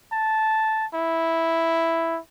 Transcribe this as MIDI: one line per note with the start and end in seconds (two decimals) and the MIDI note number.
0.12 0.85 81
0.94 2.19 64